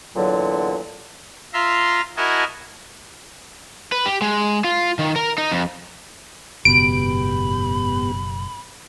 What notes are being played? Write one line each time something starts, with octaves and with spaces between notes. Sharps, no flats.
E2 A#2 D3 F#3
F4 E5 A#5 C6
E4 F#4 A#4 D#5 G#5 A5
B4
G4
G#3
F4
D#3
A#4
D#4
F2
F#1 G#2 B2 B3 G4 B5 D7